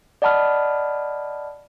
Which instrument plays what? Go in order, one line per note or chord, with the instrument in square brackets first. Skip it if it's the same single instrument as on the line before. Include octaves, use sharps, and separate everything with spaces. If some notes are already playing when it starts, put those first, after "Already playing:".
[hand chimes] D5 D#5 F#5 A5 B5 F6